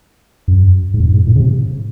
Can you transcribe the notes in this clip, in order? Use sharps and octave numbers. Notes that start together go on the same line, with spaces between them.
F#2
G#2
F#2
G#2
A2
C#3
C3